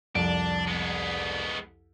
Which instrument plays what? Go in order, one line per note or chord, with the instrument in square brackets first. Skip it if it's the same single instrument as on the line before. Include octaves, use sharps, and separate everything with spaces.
[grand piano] C2 F2 D7 [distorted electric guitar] D4
[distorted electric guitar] G#3 B3